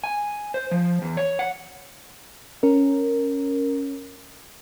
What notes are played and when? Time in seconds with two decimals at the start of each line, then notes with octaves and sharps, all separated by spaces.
0.04 G#5
0.54 C5
0.71 F3
1.02 E2
1.17 C#5
1.39 F#5
2.63 C#4 A#4